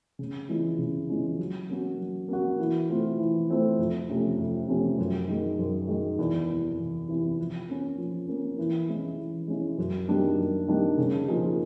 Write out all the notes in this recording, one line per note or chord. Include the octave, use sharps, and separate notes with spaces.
C#3
E3 G#3 C#4 F4
C#3
E3 G#3 C#4 F4
F#3
A#3 C#4 F#4
F#3
A#3 C#4 F#4
E3
A3 C4 F4
E3
A3 C4 F4
F2
C3 F3 A3 C#4
F2
C3 F3 A3 C#4
F#2
D#3 G#3
F#2
D#3 G#3
E2
C3 E3
E2
C3 E3
F3
A#3 C#4
F3
A#3 C#4
E3
G#3 C#4 E4
E3
G#3 C#4 E4
F#2
D#3 G3 A#3 D4
F#2
D#3 G3 A#3 D4
C#3
F3 A#3 D#4 G#4